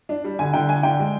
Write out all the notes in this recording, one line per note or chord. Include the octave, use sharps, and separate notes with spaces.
D4
G3
D3 G#5
D3 G5
D4 G#5
D3 G5
G#3